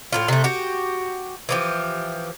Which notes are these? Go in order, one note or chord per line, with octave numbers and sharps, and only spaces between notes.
A2 C#3 F4
C3 A3
F#4 G4
E3 F3 G4